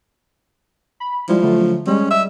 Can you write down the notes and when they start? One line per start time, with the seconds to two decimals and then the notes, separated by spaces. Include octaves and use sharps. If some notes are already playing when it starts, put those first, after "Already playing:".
1.00 B5
1.28 F3 G3 G#3 E4
1.42 D3 F#3 A3
1.87 G3 G#3 C#4
2.11 E5